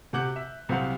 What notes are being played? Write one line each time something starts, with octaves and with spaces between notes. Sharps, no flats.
C3 F#4 F#5 D6 F#6 G6
E5
C2 F#3 C4 C5 F5 F#5